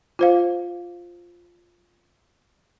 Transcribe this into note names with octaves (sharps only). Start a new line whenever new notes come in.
F4 C5 F5